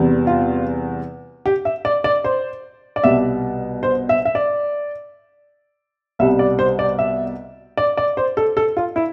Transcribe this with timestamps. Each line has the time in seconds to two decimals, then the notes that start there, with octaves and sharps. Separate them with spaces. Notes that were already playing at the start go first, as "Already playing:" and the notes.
Already playing: E2 C3 G3
0.27 F4
1.46 G4
1.65 E5
1.85 D5
2.04 D5
2.24 C5
2.96 D5
3.04 C2 B2 G3 E5
3.83 C5
4.09 E5
4.25 E5
4.35 D5
6.19 C2 B2 G3 E5
6.39 D5
6.59 C5
6.79 D5
6.99 E5
7.77 D5
7.97 D5
8.17 C5
8.37 A4
8.57 A4
8.77 F4
8.96 E4